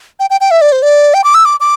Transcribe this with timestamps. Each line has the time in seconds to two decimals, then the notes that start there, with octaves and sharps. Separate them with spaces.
0.20 G5
0.30 G5
0.41 G5
0.51 E5
0.61 D5
0.72 C5
0.82 D5
1.14 G5
1.24 D6
1.34 E6
1.45 D6
1.60 D6